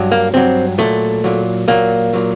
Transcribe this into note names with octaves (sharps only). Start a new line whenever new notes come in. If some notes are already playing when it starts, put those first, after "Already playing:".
Already playing: G2 F#3
A#3
G2 F#3 C4
A#2 F#3 A3
A#2 F#3
A#2 F#3 A#3
A#2 F#3